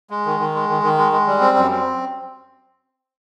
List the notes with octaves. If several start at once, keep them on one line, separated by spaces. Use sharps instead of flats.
G#3
D#3
D#3
G#3
D#3
D#3
G#3
G#3
G3
C4
F#2
C4